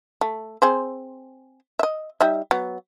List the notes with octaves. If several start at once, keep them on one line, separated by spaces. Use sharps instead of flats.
A3
C4 G#4 C5
D#5 E5
G3 D#4 E5
F#3 B3